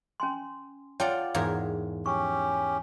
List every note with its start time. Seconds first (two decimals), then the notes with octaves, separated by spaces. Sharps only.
0.20 C#4 G#5 C6
1.00 F4 C#5 D5 F#5 G5 A5
1.35 E2 G#2 A#4 F5
2.06 C#4 G4 C#6